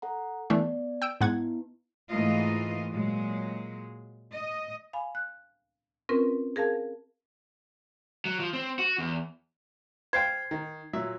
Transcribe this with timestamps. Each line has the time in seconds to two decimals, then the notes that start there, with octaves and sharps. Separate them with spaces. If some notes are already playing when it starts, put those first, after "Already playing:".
0.02 A4 F#5 A#5
0.50 E3 A3 B3 D4 D5
1.02 G5 E6 D7
1.21 G#2 B3 D#4 E4 F#5 G#6
2.10 G#2 E3 A3 A#3 F4 D#5
2.92 A#2 F#3 G#3
4.32 D#5
4.93 F5 G#5 B5
5.15 F#6
6.09 C4 C#4 F4 A#4 B4
6.56 G#4 A#4 F5 A5 G#6
8.25 F#3
8.40 F3
8.53 C4
8.79 F#4
8.98 E2
10.13 C5 F5 G5 G#6 C7
10.51 D#3
10.93 A#2 F#3 E5